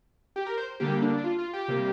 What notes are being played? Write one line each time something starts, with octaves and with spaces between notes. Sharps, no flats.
G4
A#4
C5
D3 G3 A#3 G4
D4
D4
F4
F4
G4
C3 G3 A#3